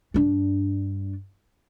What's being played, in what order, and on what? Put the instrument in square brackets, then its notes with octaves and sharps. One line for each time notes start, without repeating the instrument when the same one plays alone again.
[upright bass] G2 D4